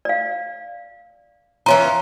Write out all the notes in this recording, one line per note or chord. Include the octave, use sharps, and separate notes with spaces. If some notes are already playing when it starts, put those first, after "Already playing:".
D5 F5
E3 C#4 F4 A#5